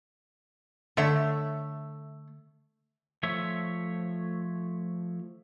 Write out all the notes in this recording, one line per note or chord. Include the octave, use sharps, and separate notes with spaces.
D3 A3 C#5 E5
F3 A3 C#5 E5